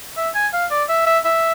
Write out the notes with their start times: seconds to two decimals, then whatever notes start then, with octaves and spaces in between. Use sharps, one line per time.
0.17 E5
0.35 G#5
0.53 F5
0.71 D5
0.89 E5
1.06 E5
1.25 E5